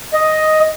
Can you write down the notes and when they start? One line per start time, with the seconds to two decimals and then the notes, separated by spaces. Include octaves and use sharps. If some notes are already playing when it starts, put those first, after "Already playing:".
0.13 D#5